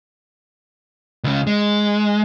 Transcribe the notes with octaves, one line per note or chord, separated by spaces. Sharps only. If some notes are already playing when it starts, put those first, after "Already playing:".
C#2 C#3
G#3